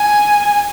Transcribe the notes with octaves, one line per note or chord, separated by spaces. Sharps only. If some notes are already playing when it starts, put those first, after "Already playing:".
Already playing: G#5